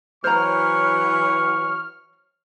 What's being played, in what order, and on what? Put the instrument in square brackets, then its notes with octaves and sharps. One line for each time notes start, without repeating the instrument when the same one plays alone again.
[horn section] E3 F#3 [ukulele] C5 C#5 A#5 [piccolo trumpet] C#6 [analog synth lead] F6